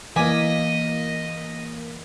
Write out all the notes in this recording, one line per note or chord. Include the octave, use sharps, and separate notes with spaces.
E3 A#3 D#5 G#5 D6 B6